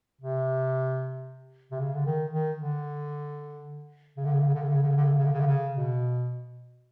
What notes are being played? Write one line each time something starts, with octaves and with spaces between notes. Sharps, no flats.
C3
C3
C#3
D3
D#3
D#3
D3
C#3
D3
C#3
D3
C#3
D3
C#3
D3
C#3
D3
C#3
D3
C#3
D3
C#3
D3
C#3
D3
C#3
B2